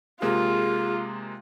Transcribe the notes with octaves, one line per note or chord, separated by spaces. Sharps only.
C3 G#3 A#3 F4 G#4